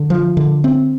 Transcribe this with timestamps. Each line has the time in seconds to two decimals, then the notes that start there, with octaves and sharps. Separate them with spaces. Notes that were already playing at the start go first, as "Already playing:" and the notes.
Already playing: D3
0.10 F3
0.37 D3
0.64 C4